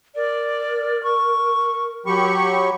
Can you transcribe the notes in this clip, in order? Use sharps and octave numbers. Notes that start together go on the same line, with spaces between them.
A#4 D5
C#6
F#3 G4 B5 C#6